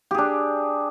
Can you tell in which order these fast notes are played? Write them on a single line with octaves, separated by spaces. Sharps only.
G4 G#4 D4